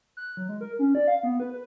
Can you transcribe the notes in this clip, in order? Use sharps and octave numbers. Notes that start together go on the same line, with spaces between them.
F#6
F#3
G#3
A#4
C#4
D5
F5
B3
B4
B4